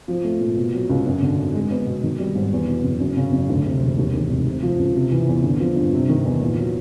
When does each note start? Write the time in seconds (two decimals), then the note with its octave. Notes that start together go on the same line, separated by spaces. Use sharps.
0.08 F3
0.24 A3
0.40 A#2
0.57 B2
0.73 F#3
0.90 C#2
1.06 F#2
1.22 D3
1.38 G#1
1.54 G#3
1.71 B3
1.86 B2
2.03 D#3
2.20 G3
2.35 G#2
2.52 E2
2.68 B2
2.84 F#1
3.00 F#2
3.17 C#3
3.32 F#1
3.49 D2
3.65 C3
3.82 E1
3.97 D#2
4.14 D#3
4.30 F1
4.46 C3
4.63 F3
4.79 C#2
4.96 C3
5.12 E3
5.28 E2
5.43 D3
5.60 F3
5.76 G2
5.93 C3
6.09 D#3
6.25 E2
6.41 A#2
6.58 F#3